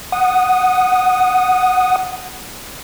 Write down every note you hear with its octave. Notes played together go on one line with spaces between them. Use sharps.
F#5 D#6